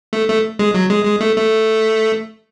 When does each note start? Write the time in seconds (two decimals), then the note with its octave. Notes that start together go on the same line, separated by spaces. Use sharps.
0.13 A3
0.28 A3
0.59 G#3
0.75 F#3
0.90 G#3
1.05 G#3
1.21 A3
1.36 A3